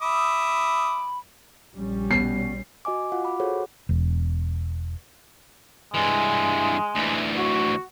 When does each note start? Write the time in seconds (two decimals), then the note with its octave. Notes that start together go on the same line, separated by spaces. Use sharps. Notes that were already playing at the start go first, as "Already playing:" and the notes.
0.02 E5 B5 D6 D#6
1.74 A#1 G3 C#4
2.11 B2 C7
2.85 F#4 D#5 G#5 D6
3.12 F4 F#4 F5 F#5
3.25 B5 D6
3.40 F#4 G#4 A4 C5 C#5 F#5
3.89 E1
5.94 G2 E3 G#3
6.95 D2 E3
7.38 F#4